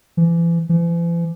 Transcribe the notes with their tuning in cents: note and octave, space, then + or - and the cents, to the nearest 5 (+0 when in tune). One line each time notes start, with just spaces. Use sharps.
E3 +35
E3 +45